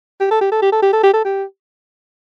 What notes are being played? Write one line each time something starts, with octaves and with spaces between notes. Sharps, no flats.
G4
A4
G4
A4
G4
A4
G4
A4
G4
A4
G4